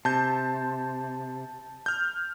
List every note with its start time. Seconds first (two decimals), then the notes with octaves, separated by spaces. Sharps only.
0.05 C3 A5 G6
1.86 F6 G6